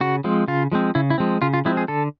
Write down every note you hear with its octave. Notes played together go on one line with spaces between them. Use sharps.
C#3 F#4
F3 G#3 C4
C#3 F4
F3 G#3 C4
C#3 E4
E4
F3 G#3 C4
C#3 F4
F4
F3 G#3 C4 E4
G#4
D3 A4